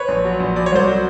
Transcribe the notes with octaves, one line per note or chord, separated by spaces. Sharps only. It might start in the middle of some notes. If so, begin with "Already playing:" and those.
Already playing: B4 C#5
A#1
F#3
A#1
F#3 D5
C#5
C2 C5 D5
F#3